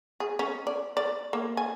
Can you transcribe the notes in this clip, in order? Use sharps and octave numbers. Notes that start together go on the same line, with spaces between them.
G#4
C#4
D5
D5
A#3
G#5